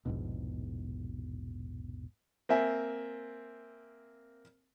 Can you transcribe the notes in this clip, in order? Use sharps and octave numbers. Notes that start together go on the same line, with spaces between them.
A#1 E2 G#2 B2
A#3 C4 E5 G#5